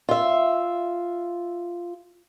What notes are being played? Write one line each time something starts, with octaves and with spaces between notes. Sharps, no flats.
F4 E5